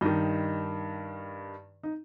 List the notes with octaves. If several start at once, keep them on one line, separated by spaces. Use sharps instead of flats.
G2 D#3 D#4
D#4